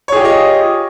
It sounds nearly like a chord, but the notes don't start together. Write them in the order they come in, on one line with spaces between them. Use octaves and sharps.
C#5 G#4 G4 F4 D#5